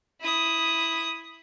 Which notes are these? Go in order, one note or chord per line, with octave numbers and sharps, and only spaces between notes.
E4 D#6